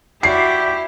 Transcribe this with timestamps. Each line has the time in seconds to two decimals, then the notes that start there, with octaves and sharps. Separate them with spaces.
0.23 E4 F#4 G4 D5 C7